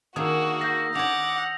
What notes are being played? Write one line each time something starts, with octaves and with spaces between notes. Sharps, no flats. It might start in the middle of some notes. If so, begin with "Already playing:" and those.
D#3 A#3 D4 F#4 G#4 D#6 E6
F5 G6 A#6
D4 C#5 F#5 D6 F7